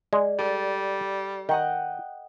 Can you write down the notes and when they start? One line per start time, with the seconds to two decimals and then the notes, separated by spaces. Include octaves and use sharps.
0.13 G#3 D5
0.39 G3 A4
1.49 D#3 D#5 F#5 G5